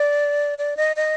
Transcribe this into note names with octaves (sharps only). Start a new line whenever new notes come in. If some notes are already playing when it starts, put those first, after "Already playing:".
Already playing: D5
D5
D#5
D#5